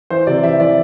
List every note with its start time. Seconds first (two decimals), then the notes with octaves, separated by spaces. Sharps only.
0.10 E3 C5
0.27 C3 D5
0.43 E3 E5
0.60 E3 D5